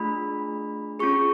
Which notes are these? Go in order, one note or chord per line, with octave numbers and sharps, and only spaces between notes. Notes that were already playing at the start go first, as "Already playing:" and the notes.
Already playing: A3 D4 F4 G#4 B5
C#4 F4 G#4 C#6